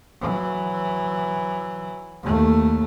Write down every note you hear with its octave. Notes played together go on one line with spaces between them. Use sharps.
E3 F#3
D#2 A3